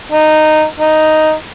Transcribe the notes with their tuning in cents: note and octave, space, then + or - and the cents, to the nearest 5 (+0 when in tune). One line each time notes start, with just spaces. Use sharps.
D#4 -10
D#4 +0